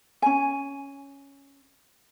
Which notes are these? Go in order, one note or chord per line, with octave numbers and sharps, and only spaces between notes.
C#4 G#5